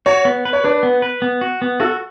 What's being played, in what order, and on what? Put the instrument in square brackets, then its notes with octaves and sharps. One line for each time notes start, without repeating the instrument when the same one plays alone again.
[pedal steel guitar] F#4 [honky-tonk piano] C#5
[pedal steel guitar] B3
B4
[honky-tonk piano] C#5
[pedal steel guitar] D4 [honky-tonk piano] B4
[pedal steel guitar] B3
B4
B3
F#4
B3
[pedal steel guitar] F#4 [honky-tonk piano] A4